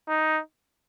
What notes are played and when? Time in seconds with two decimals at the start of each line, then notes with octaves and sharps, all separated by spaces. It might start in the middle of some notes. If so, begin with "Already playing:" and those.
0.09 D#4